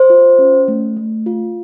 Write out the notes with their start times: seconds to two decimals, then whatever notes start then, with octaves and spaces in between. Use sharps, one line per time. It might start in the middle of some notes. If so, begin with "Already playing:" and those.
Already playing: C5
0.10 F4
0.39 C#4
0.68 A3
0.97 A3
1.26 F4